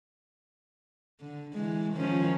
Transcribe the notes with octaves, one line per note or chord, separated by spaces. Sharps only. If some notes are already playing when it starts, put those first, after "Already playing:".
D3
E3 G#3
D#3 F3 C#4